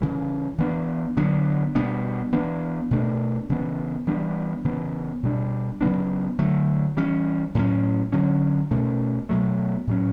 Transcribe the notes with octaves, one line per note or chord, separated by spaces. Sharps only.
C#3 E3 G3
E3 B3 D4
D3 F#3 B3 D4
B2 G3 B3 D4
E3 B3 D4
B2 A3 D4
C#3 E3 B3
E3 G3 B3 D4
C#3 E3 B3
B2 G3 D4
C#3 F#3 B3 D4
D3 F#3 A3
E3 G3 C#4
A2 F#3 C#4
D3 F#3 C#4
B2 A3 C#4
B2 F#3 A3
A2 F#3 C#4